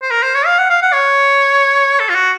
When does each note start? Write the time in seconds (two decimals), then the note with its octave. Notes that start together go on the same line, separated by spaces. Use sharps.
0.02 C5
0.11 A#4
0.22 C5
0.35 C#5
0.46 F5
0.58 F#5
0.70 F5
0.82 F#5
0.93 C#5
1.99 A4
2.09 F4
2.15 F#4